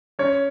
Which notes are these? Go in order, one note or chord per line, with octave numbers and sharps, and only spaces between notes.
C#4 C#5